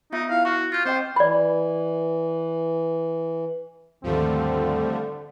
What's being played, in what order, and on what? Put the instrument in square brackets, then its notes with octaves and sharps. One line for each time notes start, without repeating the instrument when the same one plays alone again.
[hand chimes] B3 F4 E5 [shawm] D#4
[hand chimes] E4 [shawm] F5
[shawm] F#4 [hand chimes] C#6
[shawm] F4 [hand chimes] F6 G6
[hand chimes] C4 D#5 G5 [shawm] C5
[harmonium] E3 [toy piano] D5 B5
[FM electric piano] D#2 G#2 D#3 [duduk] D3 [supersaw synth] F3 G3 A3 [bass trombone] C4